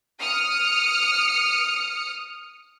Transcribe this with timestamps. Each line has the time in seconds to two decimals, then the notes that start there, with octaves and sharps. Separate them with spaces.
0.22 D#6 F6 C#7